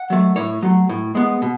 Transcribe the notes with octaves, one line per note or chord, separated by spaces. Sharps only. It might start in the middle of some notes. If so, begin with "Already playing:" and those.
Already playing: F#5
F#3 A3
A2 C#5
F#3 A3
A2
G#3 B3
B2